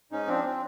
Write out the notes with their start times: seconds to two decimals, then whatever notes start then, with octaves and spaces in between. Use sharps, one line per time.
0.11 G#2 C#4 D#4
0.28 F3 C4 D4
0.44 C4